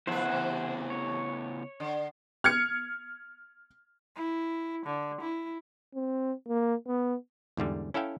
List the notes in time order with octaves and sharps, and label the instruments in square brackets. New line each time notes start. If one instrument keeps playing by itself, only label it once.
[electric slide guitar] C#3 B3 E4 [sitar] F3 B4 [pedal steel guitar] C5 E5 F#5
[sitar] C3 E3
[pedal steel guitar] C#5
[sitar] D3
[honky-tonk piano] F6 G#6 C#7
[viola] E4
D3
E4
[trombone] C4
A#3
B3
[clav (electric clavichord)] E2 G#2 D3 G3
C#4 E4 A4 E5 F5 G5